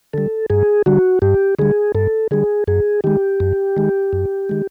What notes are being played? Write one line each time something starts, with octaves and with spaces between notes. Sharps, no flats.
D3 G3 A4
G2 G#4
D3 G3 F#4
G2 G4
D3 G3 G#4
G2 A4
D3 G3 G#4
F#2 G#4
D#3 G#3 G4
F#2
D#3 G#3
F#2
D#3 G#3